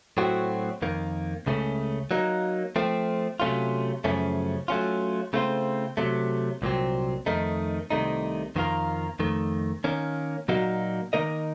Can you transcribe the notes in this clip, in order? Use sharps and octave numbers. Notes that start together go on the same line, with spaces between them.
A2 F#3 A3 C4 F#4
F2 D#3 A#3
C#2 C#3 A3 C#4
F#3 A#3 D#4
F3 A3 C4
C3 F#3 A3 C#4 F4
F#2 C#3 F3 A3 C#4
F#3 A3 C#4 F4
C#3 A3 C4 F4 C5
C3 F#3 A3
C2 A#2 F#3 C4
F2 D#3 A3 D#4
C2 C3 D#3 A3 D#4
F2 D#3 A#3 F4 A#4
F2 D#3 A3
D#3 A#3 C#4
A#2 F#3 A#3 D#4 F#4
D#3 A#3 D#4 A#4 D#5